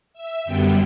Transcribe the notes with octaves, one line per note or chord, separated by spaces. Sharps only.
E5
F#2 D3 G3 B3 G5